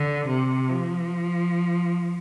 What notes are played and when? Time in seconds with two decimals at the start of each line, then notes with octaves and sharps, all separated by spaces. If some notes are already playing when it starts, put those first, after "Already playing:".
Already playing: D3
0.28 C3
0.69 F3